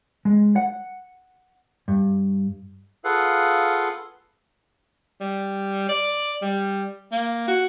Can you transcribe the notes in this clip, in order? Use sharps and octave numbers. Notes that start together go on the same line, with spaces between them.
G#3
F#5
G2
F4 G#4 A4 B4 F5 F#5
G3
D5
G3
A#3
F#4